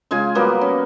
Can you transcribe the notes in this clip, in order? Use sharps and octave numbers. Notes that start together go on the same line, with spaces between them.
C#3 G#3 F4 G#5
F#3 G3 A#3 B3
C#4